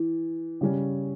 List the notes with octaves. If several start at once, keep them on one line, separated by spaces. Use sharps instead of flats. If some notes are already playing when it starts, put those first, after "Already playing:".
Already playing: E3
C#3 G3 C#4